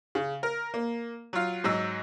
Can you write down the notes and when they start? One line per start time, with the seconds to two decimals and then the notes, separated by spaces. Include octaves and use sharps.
0.15 C#3
0.43 A#4
0.74 A#3
1.33 F#3 F4
1.64 G#2 F#3 E6